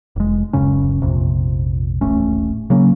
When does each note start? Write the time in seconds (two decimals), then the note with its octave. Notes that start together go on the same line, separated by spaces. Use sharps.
0.16 F1 G#3
0.53 D1 F#2 C#3 C#4
1.02 A#1 F2 C3
2.01 D#1 A1 A3 C#4
2.70 C#3 F#3 A#3 C#4